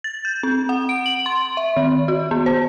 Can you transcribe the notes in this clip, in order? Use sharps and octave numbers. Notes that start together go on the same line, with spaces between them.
A6
G6
C4
F#5
D7
F#7
C6
E5
D#3
F#4
B3
C5